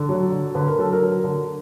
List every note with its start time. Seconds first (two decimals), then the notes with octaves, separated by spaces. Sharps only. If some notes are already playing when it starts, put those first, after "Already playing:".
Already playing: D3 A4
0.09 F#3
0.32 D3
0.55 D3 B4
0.68 A#4
0.78 F#3 A4
0.92 A#4
1.02 F#3
1.24 D3